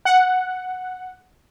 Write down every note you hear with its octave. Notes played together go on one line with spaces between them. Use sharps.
F#5